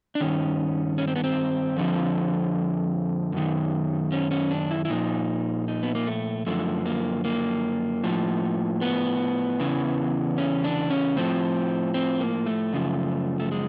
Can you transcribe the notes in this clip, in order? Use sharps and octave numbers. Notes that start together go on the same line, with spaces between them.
D4
G2 D#3 C#4
C#4
C4
B3
C4
F2 D3 F3
F#2 D#3
C#4
C#4
D4
E4
E4
A#2 F3 D#4
D#4
B3
A#3
A3
F#2 D3 F3 A3
A#3
A#3
A2 F3
B3
E2 C#3 E3
C#4
D4
C#4
A2 F3 C4
C4
A#3
A3
F#2 C#3 F3
A3
G#3